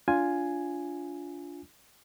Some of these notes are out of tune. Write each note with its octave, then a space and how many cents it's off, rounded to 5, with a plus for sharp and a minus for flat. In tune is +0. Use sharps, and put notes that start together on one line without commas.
D4 -25 F4 +0 G#5 +0